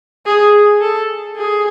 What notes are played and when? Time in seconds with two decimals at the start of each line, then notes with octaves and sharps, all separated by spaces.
0.26 G#4
0.81 A4
1.36 G#4